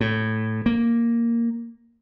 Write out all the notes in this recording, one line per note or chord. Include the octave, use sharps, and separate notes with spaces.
A2
A#3